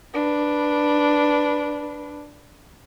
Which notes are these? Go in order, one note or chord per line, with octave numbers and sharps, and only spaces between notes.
D4 B4